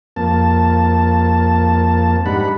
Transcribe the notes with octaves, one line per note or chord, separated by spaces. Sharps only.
F2 A#3 A5
G#2 G3 D4 D#4 F#5 B5